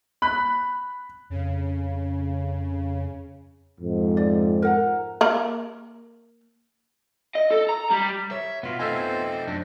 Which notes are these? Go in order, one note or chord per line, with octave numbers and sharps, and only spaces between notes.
B5 F#6
F2 C#3
F2 G#2
D5
A#4 F#5 A#5
A#3 A#4
D#5
A4
A#5
G3
C#5 E5
B2 B3 F4
A3 C4 D#4 A4 C5 E5 G#5
F#2 D4